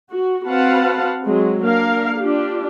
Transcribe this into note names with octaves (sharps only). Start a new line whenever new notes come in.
F#4
C4 F#4 B4 F5 F#5 A5
F#3 G#3 C4
A#3 D4 A#4 F5
D4 F4 G4